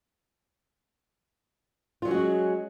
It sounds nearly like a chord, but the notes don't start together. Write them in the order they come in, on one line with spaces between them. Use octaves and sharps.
F4 F#3 C#4 F#4 G#3